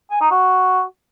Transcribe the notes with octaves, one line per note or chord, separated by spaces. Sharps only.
G#5
D#4
F#4